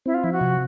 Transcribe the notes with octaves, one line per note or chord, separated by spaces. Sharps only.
C4 E4
F4
F3 E4
F#4
C3